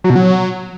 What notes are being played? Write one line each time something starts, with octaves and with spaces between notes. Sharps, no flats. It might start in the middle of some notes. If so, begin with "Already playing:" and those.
F#3
B2
F#3